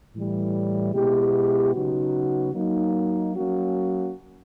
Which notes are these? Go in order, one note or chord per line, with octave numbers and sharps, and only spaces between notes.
A2 E3 G3
B2 G#3 B3 E4 G4
C#3 F#3 B3 D#4 F#4
F#3 A#3 D#4
F#3 A#3 C#4 F#4